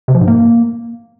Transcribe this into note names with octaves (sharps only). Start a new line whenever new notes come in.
C3
F3
G#2
A#3